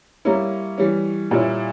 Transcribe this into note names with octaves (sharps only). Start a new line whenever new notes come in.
G3 A#3 C#4 E4
E3 G3 C#4
A#2 G3 C#4 E4